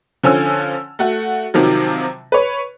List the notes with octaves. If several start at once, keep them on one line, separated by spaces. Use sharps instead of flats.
D3 F3 C#4 G#5 E6
A3 F#4
C3 D#3 F3 F#3
B4 C#5